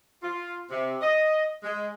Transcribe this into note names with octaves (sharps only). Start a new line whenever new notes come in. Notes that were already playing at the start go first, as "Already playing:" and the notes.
F4
C3
D#5
G#3